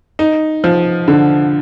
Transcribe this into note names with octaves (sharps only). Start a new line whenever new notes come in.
D#4
F3
D3